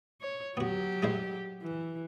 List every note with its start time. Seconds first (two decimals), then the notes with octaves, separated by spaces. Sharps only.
0.21 C#5
0.57 F#3 B3 F#4 G4
1.03 G#3 E4 C5
1.62 E3